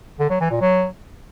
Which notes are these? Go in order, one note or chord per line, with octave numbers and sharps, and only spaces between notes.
D3
F#3
E3
A#2
F#3